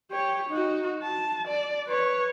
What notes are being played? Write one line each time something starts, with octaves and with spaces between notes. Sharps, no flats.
G4 C#5
D#4 F#4
A5
D5
B4 C#5